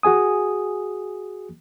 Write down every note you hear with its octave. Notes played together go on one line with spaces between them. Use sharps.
F#4 G#4 G#5 D#6